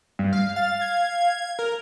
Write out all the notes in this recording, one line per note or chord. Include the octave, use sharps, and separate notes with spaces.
G2
F5
F5 A6
G#6
A#4